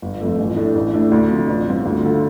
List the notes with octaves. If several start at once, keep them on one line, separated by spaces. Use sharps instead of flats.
G1
F2 F3 A3
A1
A2 A3 D4
A1
A2 A3 D4
D2
C3 F3 D4
A1
G2 G3 C4 F4
D2
D3 A3 F4